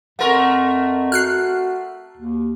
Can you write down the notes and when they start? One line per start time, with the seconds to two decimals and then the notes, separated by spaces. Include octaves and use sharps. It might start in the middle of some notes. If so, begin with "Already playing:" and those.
0.19 F2 A3 A#4 F#5 C6 C#6
1.12 F#4 F6 F#6 C7
2.17 D#2